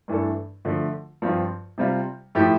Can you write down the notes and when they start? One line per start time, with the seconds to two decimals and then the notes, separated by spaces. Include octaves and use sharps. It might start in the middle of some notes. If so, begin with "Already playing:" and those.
0.08 G2 E3 A3 D4 A4
0.65 D3 F3 A3
1.22 G2 F3 C4 F4
1.78 C3 G3 C4 F4
2.35 A2 F3 A3 E4 G4